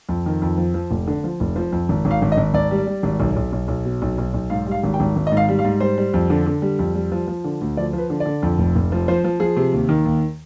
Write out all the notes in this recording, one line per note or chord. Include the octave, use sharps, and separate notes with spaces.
F2
D#3
F2
F3
F3
F1
D3
F3
F1
F3
F2
G#1
G#1
F5
G#1
D#5
G#1
G#1 D5
G3
G3
G#1
B1
B1
B1
B1
B2
B1
B1
B1
G#2 F5
G3 F5
G#1
G5
G#1
G#1
D#5
G#2
F5
G3
F5
G#2
G3 C5
G3
F2
D3
D3
G3
F2
G3
F3
F3
D3
D2
F3 D5
F3 B4
D3
D5
D3
F2
F1
F1
F3
F3 C5
F3
F3 G#4
C3
D#2
D#3
D#2